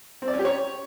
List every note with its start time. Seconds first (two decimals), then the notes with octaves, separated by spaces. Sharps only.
0.22 C4
0.28 D5
0.33 C#4
0.39 G4
0.45 C#5